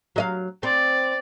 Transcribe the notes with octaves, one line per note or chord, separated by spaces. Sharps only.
F#3 D#5 F5
C4 D5